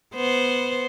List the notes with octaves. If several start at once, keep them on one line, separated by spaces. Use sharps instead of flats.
B3 C5